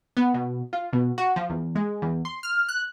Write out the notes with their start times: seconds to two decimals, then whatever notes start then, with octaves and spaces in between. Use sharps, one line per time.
0.17 B3
0.34 B2
0.73 F4
0.93 B2
1.18 F#4
1.36 F3
1.50 E2
1.75 G#3
2.02 E2
2.25 C6
2.43 F6
2.69 F#6